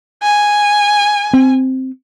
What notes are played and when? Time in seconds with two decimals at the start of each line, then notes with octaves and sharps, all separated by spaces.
0.23 G#5
1.33 C4